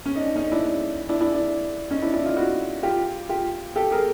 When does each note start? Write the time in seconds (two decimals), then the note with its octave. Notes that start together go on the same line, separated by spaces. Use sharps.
0.06 C#4
0.15 D#4
0.21 D4
0.36 C#4 D#4
0.52 D4 E4
1.09 D4 E4
1.21 D4 E4
1.32 D4
1.91 C#4 D#4
2.02 D4 E4
2.13 D4 E4
2.25 D#4 F4
2.37 E4 F#4
2.83 F4 G4
3.29 F4 G4
3.76 G4 A4
3.91 G#4 A#4